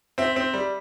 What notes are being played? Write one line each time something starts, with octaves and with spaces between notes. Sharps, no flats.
C4 E5
C4
G3